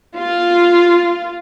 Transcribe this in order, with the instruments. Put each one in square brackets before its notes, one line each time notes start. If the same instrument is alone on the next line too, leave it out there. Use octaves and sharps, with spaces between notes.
[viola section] F4